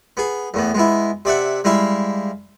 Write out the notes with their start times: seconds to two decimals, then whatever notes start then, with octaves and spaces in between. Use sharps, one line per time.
0.17 B3 G#4
0.54 E2 A2 B3
0.74 G#3 B3 E4
1.25 C3 D5 E5 F#5
1.64 G3 G#3 E4 E5 F5